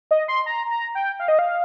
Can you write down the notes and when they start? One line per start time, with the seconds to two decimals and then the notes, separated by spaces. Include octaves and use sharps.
0.11 D#5
0.28 C6
0.46 A#5
0.70 A#5
0.95 G5
1.19 F5
1.28 D#5
1.39 F5